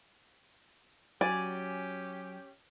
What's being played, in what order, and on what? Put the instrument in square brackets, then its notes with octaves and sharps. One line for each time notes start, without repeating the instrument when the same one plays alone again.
[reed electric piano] F#3 [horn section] C#4 G4 [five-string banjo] D5 [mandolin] G#5